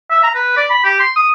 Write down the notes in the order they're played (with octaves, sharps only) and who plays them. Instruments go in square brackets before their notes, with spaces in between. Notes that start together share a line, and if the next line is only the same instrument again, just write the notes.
[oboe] E5
A#5
B4
D5
B5
G4
C6
D#6